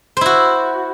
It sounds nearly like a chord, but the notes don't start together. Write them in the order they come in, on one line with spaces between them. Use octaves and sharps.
C5 E4 F#4